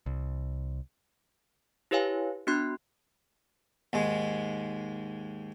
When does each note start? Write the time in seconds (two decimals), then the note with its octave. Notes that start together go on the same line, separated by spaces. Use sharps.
0.06 C2
1.91 E4 G4 B4 C#5 F5 G#5
2.47 B3 D4 F#4 C6 F#6
3.93 D#2 G#2 G#3